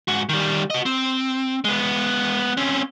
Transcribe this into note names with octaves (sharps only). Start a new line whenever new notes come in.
G#2 F#4
D#3 G3
F#4 D#5
C4
G#3 B3
C4 C#4